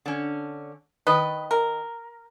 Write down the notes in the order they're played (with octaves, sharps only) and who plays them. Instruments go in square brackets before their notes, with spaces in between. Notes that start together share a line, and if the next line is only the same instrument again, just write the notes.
[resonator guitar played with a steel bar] D3 C#4
[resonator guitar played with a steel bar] D#3 D#5 [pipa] B4
[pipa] A#4